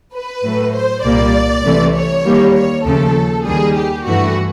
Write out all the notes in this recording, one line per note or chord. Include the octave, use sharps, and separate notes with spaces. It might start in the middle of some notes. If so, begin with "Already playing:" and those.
B4
A2 F#3 A3
C5
C2 A#2 G3 A#3 D5
C2 C3 E3 A3
C#5
D#2 D#3 G3 A#3
C#5
D#2 C#3 F3 A3 A4
D#2 D#3 G3 G#4
G4
G2 E3 A3 F#4